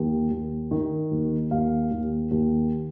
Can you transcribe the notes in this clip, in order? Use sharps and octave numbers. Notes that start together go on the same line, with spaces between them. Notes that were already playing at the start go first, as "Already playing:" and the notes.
Already playing: D#2
D#2
D#3
D#2
D#2 F5
D#2
D#2